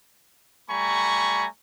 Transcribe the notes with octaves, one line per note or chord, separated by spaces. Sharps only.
G3 A3 G#5 A#5 B5 C#6